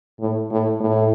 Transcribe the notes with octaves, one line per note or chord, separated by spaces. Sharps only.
A2
A2
A2